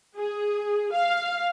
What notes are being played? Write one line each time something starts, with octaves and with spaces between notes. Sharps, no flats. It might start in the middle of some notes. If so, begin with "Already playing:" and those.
G#4
F5